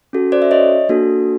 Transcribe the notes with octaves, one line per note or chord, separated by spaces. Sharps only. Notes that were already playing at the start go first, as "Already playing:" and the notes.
C#4 F#4 A4
C5 D5
E5
C#5 D#5
A#3 D4 F#4 A4